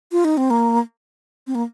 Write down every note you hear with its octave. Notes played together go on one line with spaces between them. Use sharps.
F4
D#4
C4
A#3
C4
A#3